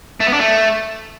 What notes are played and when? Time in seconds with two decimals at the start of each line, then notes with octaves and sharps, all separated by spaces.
0.21 A3
0.27 B3
0.33 D4
0.40 A3